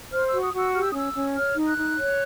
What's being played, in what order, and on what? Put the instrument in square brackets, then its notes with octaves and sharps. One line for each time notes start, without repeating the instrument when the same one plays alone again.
[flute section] C5 F6
F#4 E6
D#6
F#4
E6
G4 F6
E6
C#4 D#6
E6
C#4
C#5 F6
D#4
F#6
D#4
C#5